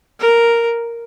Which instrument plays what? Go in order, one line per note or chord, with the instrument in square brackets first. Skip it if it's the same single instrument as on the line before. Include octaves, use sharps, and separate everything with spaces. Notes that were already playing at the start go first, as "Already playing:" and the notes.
[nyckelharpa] A#4